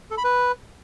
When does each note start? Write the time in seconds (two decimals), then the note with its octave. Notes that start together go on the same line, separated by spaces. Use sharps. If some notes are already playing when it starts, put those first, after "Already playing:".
0.11 A4
0.17 B5
0.24 B4